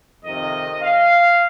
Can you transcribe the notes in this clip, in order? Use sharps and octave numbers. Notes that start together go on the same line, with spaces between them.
F2 C3 D#3 D#5
F5